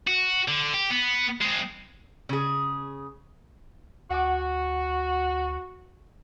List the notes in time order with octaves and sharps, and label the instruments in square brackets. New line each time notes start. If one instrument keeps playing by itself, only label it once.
[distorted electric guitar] F#4
D3
G4
B3
G#3 C4
[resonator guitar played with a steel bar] C#3 G#4
[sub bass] D2 [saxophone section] F#4 [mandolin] F#5 G#5 D6